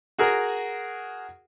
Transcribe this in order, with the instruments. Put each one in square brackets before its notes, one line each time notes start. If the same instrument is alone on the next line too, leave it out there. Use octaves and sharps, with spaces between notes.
[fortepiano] F#4 G#4 A#4